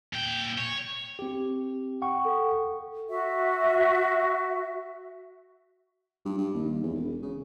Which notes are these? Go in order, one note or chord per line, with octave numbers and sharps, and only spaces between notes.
A#2 G5
C#5
C4 G4
F#5 G5 C#6
A4 F5
F#4 E5
G2
G2
D#2
E2
E1
C#3